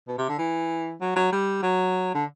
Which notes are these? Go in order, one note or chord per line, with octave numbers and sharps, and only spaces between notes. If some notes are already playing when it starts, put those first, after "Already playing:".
B2
C3
D3
E3
F#3
F#3
G3
F#3
D3